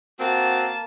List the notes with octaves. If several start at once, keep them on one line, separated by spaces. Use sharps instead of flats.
A#3 C4 F#4 A5